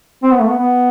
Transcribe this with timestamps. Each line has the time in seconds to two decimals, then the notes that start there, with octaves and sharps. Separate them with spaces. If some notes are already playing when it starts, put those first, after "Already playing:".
0.23 C4
0.31 B3
0.39 A3
0.48 B3
0.58 B3